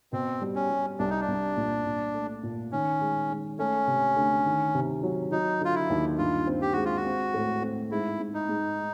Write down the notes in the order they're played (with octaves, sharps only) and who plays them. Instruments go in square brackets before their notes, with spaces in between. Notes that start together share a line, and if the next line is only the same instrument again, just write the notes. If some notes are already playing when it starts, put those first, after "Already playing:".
[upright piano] B2 [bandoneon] C4
[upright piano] G3
[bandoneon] C#4
[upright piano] G3
[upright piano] C2 [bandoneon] D4
[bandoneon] D#4
D4
[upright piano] C2
A#2
A#2
A3
A#2
[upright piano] D#3 [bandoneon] C#4
[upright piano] G#3
G#3
[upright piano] A3 [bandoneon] C#4
[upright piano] C3
D2
D#3
C3
F#3
[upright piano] F#3 [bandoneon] D#4
[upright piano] D3 [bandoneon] F4
[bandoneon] E4
[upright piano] D#2
[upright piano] G2 [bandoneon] F4
[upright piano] C4
[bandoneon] G4
[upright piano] G#3 [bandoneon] F#4
[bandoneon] F4
F#4
[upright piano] C4
A2
C4
[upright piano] G#2 [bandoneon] E4
[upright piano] G#2
[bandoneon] D#4
[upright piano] G#2